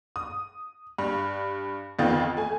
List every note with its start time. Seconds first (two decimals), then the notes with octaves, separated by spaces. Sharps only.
0.16 D#6
0.98 G2
1.99 A1 F2 D#3 B3 F4 A6
2.37 A3 G#5